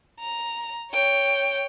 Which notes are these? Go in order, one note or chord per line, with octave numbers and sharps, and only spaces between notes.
A#5
C#5 G5